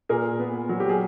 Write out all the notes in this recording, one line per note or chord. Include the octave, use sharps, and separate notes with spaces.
A#2 G#4 A#4
B3
F#3
G4
G#4